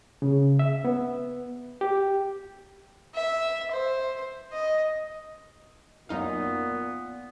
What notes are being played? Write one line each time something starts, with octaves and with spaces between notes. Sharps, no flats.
C#3
E5
B3
G4
E5
C5
D#5
F#2 A#2 B3 D#4 F5